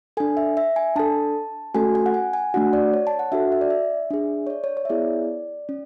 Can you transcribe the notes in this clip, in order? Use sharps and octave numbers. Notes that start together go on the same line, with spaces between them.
D4 A4 G#5
E5
E5
G#5
D4 A4 A5
A3 C#4 F#4 A4 G#5
G#5
F#5
G#5
G#5
A3 D4 F#4 F#5
D5
C#5
A5
F#5
D4 F#4 A4 E5
E5
D5
E5
D4 G#4
C#5
D5
C#5
C#5
E5
B3 E4 G#4 D5
C#4